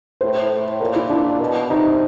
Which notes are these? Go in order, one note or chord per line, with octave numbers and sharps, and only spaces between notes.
A2 C5
A2
A#2 A#4
E4
D4
B2
C3 D#4